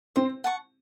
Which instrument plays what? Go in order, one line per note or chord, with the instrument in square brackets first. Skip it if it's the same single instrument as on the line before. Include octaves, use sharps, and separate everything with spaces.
[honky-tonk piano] C4 [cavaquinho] C5
[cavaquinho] F#5 A5 C#6